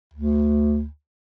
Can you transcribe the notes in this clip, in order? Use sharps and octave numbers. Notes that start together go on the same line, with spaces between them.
D2